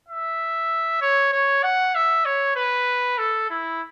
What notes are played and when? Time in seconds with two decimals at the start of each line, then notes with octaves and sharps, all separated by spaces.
0.08 E5
1.01 C#5
1.33 C#5
1.63 F#5
1.95 E5
2.25 C#5
2.56 B4
3.18 A4
3.50 E4